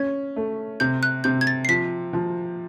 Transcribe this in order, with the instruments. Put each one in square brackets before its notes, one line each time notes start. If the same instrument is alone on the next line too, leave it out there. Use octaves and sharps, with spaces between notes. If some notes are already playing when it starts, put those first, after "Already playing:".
Already playing: [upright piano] C#4 [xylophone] G#6
[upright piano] A3
[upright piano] C3 [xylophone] G6
[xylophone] F#6
[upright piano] C3 [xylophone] G6
[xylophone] G#6
A6
C7
[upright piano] F3 [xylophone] B6
[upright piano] F3